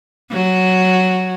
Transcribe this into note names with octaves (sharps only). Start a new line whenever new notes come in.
F#3